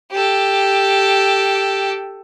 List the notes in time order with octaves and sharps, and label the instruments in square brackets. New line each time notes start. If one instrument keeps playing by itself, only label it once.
[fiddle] G4 A4